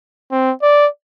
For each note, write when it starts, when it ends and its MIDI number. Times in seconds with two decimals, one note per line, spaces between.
0.32 0.52 60
0.63 0.87 74